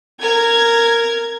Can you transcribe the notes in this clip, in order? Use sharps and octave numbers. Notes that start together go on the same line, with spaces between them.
A#4 G#6